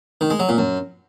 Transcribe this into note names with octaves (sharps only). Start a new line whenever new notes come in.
D#3
G#3
F#3
A#2
F#2